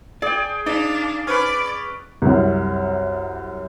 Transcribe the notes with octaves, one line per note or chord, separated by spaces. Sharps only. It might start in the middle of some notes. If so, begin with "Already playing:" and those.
G#4 D5 G5
D4 D#4 D5 F5
C#4 B4 D5
C2 F#2